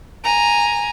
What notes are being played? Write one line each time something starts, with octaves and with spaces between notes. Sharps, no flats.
G#5 A#5